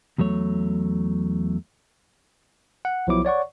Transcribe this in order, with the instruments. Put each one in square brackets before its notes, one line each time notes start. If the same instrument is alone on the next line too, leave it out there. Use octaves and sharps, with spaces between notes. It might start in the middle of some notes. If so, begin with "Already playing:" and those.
[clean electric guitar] E2 F#3 A3 C#5
[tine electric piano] F#5
B1 F3 F#3 B3 E4 D6
C#5 D5 F#5 C#6